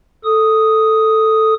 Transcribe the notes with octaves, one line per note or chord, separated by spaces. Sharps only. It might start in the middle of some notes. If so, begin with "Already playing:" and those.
A4 D#6